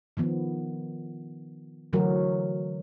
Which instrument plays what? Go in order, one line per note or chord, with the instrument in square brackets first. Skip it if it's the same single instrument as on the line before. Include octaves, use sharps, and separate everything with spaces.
[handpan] D#3 F3 B3
D3 E3 F#3 A3 F#4 A#4